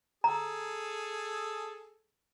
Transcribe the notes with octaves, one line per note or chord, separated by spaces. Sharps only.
G#4 A4 A#5